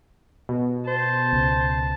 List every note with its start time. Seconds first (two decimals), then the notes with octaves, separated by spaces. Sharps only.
0.49 B2
0.88 C5 A5
1.33 C#2